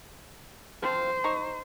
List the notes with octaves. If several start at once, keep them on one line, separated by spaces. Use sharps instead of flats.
F3 C4 F4 C5
D#4 A#5 C#6